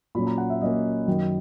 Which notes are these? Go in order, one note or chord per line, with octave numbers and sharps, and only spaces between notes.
A#2 F#3 A#3 C#4 B5
A#5
F#5
E5
A#2 F#3 A#3 C#4 D#5
F#2 D#3 F#3